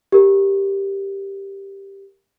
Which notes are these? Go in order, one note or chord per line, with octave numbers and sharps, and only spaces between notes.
G4 A#4